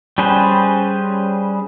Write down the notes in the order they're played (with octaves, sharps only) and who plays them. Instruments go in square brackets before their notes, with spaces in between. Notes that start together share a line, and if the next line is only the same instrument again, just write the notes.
[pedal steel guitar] G3 C#4 G#4 B4 C5